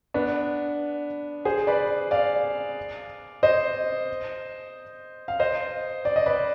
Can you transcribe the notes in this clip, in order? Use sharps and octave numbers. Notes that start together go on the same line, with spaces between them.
B3 D4
G#4 C5
B4 D5
D5 F5
C5 D#5
F5
C5 D#5
D5
D#5
B4 D5